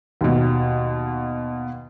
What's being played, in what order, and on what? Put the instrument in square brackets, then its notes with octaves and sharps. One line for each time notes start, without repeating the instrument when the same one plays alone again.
[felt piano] D#2 B2